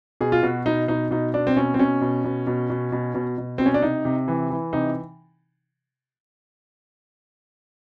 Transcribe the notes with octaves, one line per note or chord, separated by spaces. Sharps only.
B2 G#4
F4
B2 F#4
B2 D#4
B2 D#4
B2 D#4
B2 D4
C4
B2 C#4
C4
B2 C#4
B2
B2
B2
B2
B2
B2
B2
B2 C4
C#4
D4
C3 D#4
C3
E3
E3
C3 D#4